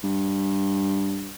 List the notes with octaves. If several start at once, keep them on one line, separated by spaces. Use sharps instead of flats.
G2